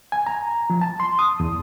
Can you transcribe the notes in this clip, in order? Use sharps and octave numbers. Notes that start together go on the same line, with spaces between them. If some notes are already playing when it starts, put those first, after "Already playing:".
G#5
A#5
F3
A5
C6
D#6
E2